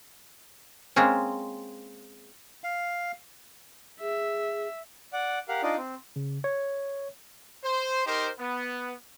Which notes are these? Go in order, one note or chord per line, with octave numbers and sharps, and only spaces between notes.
G#3 A#3 C4 C#4
F5
G#4 E5
D5 F#5
G4 A#4 F5 F#5
D4 D#4 F4 D5 D#5
C4
C#3
C#5
C5
D#4 G4 A#4 C5
B3